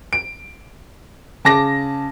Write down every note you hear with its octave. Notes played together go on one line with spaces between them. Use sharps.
D7
C#3 A5 D6 A#6